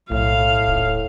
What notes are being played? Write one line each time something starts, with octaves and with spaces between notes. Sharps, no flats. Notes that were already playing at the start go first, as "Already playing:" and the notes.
B1 A2 F5
D#1